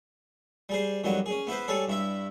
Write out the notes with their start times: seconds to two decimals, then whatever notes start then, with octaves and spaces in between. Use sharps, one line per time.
0.69 G3 G#4 C5
1.04 F2 D#3 F#3 G3 F#5
1.26 C#4 G#4
1.47 B3 E4 B4 C5
1.68 G3 G#4 A4 C#5
1.88 G2 E4 E5